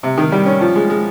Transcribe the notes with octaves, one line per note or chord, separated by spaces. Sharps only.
C3
D#3
G3
C#4
F3
G#3
G#3